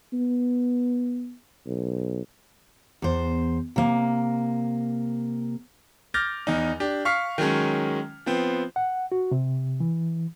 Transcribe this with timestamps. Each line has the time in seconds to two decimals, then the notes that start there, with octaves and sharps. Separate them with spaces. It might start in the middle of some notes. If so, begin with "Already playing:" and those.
0.13 B3
1.67 B1
3.02 E2 C5
3.76 C3 A#3
6.14 D6 F6 G6 A6 A#6
6.47 E2 D#4
6.80 D4 G4
7.05 F5 C#6 F6 B6 C7
7.38 D#3 F#3 G#3 C#4
8.26 F3 B3 C4
8.76 F#5
9.12 F#4
9.31 C3
9.80 E3